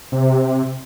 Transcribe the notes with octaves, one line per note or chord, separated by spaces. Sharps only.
C3